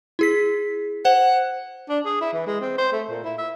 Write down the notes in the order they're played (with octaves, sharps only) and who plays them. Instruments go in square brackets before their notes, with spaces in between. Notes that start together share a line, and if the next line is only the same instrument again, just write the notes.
[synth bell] E4 G#4 B6
[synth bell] C5 [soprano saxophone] F#5
[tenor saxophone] D4
G#4
E4
E3
G#3
C4
C5
A3
A#2
E4
E5